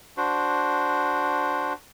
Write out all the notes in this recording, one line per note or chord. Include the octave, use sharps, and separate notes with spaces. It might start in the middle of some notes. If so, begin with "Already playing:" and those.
D4 F#4 C5